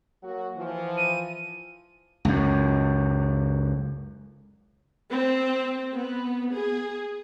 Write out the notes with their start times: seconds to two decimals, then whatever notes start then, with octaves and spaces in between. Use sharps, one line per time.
0.23 F#3 A#3 F#4
0.56 E3 F3
0.97 D#7
2.25 C#2 F#2
5.11 C4
5.95 B3
6.54 G#4